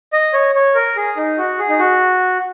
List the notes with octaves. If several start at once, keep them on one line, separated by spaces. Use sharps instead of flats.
D#5
C#5
C#5
A#4
G#4
D#4
F#4
G#4
D#4
F#4